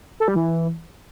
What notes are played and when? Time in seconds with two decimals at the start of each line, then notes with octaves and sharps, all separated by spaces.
0.20 A4
0.28 G3
0.36 E3